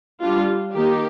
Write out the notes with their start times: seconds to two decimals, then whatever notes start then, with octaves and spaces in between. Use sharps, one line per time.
0.21 G3 D4 F4
0.74 D#3 A#3 D#4 G4